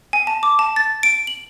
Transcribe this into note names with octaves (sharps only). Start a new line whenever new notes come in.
G#5
A5
D6
A5
A6
D7
F#7